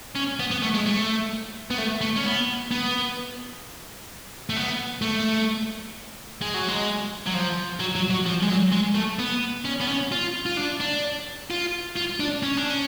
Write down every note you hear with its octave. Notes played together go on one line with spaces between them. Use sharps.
C#4
B3
B3
A3
G#3
A3
B3
A3
A3
C#4
B3
B3
A3
B3
A3
G#3
F#3
G#3
F#3
F3
F#3
F#3
F#3
F3
G#3
F#3
G#3
A3
B3
C#4
B3
C#4
F4
F4
D4
D4
F4
F4
D4
C#4
D4
C#4